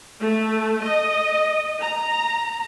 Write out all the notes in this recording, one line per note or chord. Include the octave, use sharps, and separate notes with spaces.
A3
D#5
A#5